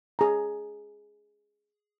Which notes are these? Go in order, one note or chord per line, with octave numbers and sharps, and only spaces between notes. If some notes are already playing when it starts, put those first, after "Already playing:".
G#4 A#5